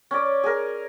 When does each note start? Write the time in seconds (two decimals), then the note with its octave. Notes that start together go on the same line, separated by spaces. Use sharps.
0.11 C#4 D5
0.44 G#4 A#4